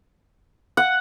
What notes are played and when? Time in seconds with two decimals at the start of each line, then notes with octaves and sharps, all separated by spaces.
0.77 F#5